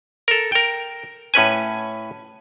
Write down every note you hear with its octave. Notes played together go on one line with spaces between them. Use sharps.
A4 A#4
A#4 G5
A2 C#4 B4 G#5